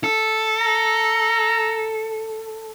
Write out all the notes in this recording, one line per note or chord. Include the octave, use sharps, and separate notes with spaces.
A4
A#5